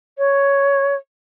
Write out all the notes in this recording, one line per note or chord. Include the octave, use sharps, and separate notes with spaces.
C#5